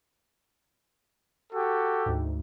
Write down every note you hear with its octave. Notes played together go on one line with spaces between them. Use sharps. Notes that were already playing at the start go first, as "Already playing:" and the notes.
F#4 G4 A4
D2 G#2